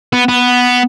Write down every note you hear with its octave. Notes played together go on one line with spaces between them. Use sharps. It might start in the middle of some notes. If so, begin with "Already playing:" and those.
B3
B3